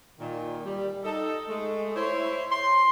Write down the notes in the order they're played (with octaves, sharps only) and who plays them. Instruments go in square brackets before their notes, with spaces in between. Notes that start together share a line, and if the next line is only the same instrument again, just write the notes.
[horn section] A#2 D#3
G3
D#4 A4
G#3 A3
E4 C5 C#5
C6